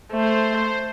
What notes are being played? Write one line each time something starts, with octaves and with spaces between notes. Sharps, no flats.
A3 C5